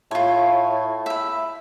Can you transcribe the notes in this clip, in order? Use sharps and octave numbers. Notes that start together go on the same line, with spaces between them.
A2 F4 C#5
E5 B5